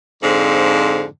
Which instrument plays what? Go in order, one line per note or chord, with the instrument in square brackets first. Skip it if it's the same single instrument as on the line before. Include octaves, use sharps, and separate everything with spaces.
[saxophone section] F2 G#2 D3 F3